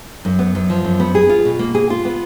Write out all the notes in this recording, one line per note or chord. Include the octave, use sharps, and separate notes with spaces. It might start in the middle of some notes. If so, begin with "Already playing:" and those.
F#2
B3
F#2
F3
F#2
B3
G#4
F4
B2
A#3
G#4
F4
B3